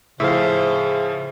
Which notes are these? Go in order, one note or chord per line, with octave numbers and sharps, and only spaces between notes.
A2 C#3 F3 C5 E5 F5